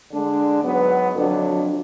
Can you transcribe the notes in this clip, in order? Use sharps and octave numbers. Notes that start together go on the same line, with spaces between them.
D3 G#3 D4
G#2 F#3 B3
F2 D3 F#3 D4